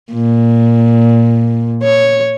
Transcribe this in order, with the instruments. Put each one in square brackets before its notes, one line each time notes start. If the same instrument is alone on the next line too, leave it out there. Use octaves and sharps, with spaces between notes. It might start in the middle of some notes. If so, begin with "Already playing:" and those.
[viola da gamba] A#2
C#5